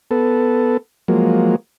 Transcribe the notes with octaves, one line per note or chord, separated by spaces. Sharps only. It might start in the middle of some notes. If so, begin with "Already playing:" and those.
B3 A4
F3 F#3 G#3 A#3